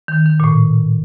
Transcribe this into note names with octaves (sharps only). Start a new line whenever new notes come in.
D#3
D#3
A#2
A2